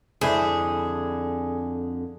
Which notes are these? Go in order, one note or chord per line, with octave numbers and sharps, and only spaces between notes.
F2 D3 D4 E4 G#4 C5